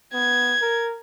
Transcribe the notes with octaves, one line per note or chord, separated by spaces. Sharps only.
B3 G#6
A#4